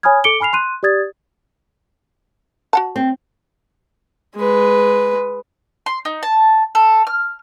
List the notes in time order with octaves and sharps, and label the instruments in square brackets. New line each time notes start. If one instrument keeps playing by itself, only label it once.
[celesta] C#5 G#5 B5 D#6 F6 G#6
A4 D6 C#7 D7 G7
G#5 B5 F6 C7 F7
C6 F#6 D#7
G4 D5 D#6 G#6 A6
[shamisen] F#4 F#5 A5
[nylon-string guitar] C4
[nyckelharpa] G#3 B4
[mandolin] C6
D#4
A5
A4
F6